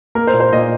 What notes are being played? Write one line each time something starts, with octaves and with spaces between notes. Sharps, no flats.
A#3 A#4
C5
A#2
C5
A#2 D#5